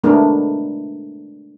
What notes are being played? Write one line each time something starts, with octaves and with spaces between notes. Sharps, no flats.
G#3 A3 B3 D4 G#4 A#4